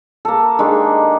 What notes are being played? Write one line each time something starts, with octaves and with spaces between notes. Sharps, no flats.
A#3 A4
D#3 G#3 D4 G4